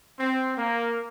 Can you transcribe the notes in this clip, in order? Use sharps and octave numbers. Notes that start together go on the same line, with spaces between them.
C4
A#3